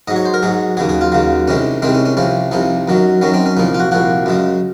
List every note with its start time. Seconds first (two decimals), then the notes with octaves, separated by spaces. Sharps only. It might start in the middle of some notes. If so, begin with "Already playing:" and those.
0.08 G#2 F#3 D#5
0.16 C#5
0.25 C5
0.34 A#4
0.43 G#2 F#3 G#4
0.77 D#2 C#3 F#3 G#4
0.89 G#4
1.01 F4
1.12 D#2 C#3 F#3
1.48 C2 C3 D#3 G#3 C#4
1.82 C2 C3 D#3 G#3 C4
1.95 C#4
2.05 C#4
2.17 C2 C3 F3 C#4
2.51 C2 C3 F3 D#4
2.88 F#2 D#3 F#3
3.21 F#2 D#3 F#3 C#4
3.34 C4
3.46 C#4
3.57 C2 A#2 F3 D#4
3.74 F4
3.80 F#4
3.91 C2 A#2 F3 F#4
4.26 F#2 C#3 G#3